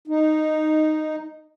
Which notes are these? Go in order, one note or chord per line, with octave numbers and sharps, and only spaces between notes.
D#4